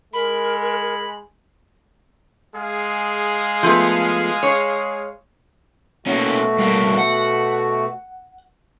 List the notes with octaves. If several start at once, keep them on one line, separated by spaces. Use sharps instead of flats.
G#3 A#4 B5
G#3 G#4 F5
F3 A3 B3
C#5
B2 A3 A#3 C#4 F#4
G2 A#3
F#5